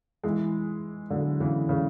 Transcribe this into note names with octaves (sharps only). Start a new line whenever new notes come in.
E3 G#3
D3 F#3
C#3 E3
C#3 E3